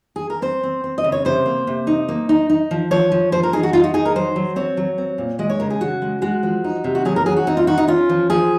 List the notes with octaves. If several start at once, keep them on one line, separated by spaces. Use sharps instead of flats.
G#4
A#4
C4 C5
C4
C4
D#5
C#3
C#5
C3 C5
A#3
C3
D#4
A#3
D#4
D#4
F3
F3 C#5
F3
F3 C5
A#4
D#4 G#4
F#4
D#4 F4
F#4
D#4 G#4
A#4
F#3 C5
F#3
C4 C#5
F#3
C4
A#2
G#3 D#5
C#5
C#3 A#4
G#4
C#3 F#4
G#3
G#3 F#4
F3
D#4
C3
F#4
F#3 G#4
A#4
F#3 G#4
F#4
C4 D#4
F4
D#4 F#4
D#4
C#4 F4
F3
F3 G#4